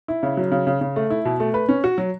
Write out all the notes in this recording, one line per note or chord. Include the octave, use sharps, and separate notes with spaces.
E4
C#3
F#3
C#3
C#3
C#3
A3
E4
B2
A3
B4
C#4
F#4
F#3